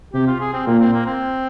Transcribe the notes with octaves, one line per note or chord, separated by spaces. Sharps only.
C3 G4
F4
G#4
C4
A#2 A#3
C4
A#3
C4